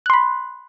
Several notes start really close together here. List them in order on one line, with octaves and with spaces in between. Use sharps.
F#6 C6 B5